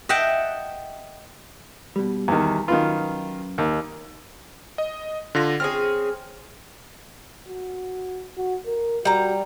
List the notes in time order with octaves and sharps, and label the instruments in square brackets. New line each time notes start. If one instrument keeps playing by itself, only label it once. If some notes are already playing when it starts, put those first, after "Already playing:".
[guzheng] D#5 E5 F#5 G5 A5
[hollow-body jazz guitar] B2 G3
[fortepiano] E2 D#3
[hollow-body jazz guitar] F#2 A#2 B4 [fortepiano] D#3 F4
[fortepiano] D#2
[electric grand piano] D#5
D3 F4 A#6
[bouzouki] C4 C#4 G#4 [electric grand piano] F6
[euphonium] F#4
F#4
A#4
[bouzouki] G3 A#5 [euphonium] F#4